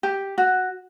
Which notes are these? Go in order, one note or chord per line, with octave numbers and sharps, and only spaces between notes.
G4
F#4